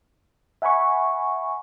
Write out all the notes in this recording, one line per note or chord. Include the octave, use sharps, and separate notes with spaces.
E5 F#5 G#5 B5 C#6